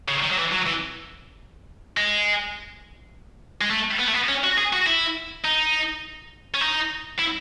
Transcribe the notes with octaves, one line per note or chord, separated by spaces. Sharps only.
C#3
D#3
F#3
E3
F#3
E3
G#3
G#3
A3
B3
A3
B3
C#4
F#4
G#4
F#4
E4
D#4
C#4
D#4
E4